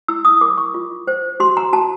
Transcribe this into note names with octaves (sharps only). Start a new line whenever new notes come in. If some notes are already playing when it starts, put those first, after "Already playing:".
E4 E6
D#6
A#4 D6
C#6
F4
C5
F#4 C6
A#5
F#4 A5